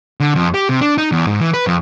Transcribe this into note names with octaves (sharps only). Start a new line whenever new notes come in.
D3
F2
G4
C3
D4
D#4
E2
G#2
E3
B4
F2